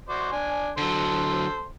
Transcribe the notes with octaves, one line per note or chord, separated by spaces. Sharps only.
F#4 C5 D5
D4 G#5
D3 F#3 A4 C5